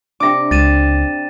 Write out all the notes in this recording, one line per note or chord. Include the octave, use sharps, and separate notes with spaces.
C3 D4 D6 A#6 C#7
C#2 A6 D#7 E7